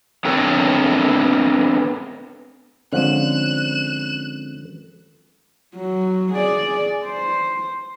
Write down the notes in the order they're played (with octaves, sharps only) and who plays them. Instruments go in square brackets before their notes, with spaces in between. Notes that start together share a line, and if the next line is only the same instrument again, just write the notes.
[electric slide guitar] B3 C4 D4 A4 A#4 C#5
[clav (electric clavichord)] D3 F3 [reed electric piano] G#3 C4 C#4 [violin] F#6 E7
[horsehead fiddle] F#3
G#4 D5
C5